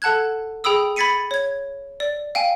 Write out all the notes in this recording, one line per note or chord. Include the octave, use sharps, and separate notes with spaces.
A4 F#5 A5 F#6 G#6
G#4 G5 B5 D#6 E6
B5 G#6 A6 B6 C#7 D#7
C#5 G#6
D5
F5 G5 G#5